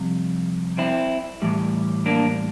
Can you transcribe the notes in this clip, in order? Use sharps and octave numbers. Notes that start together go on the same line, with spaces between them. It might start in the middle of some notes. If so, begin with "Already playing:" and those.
Already playing: F2 C3 G3
C4 E4
A2 E3 G3
A#3 D4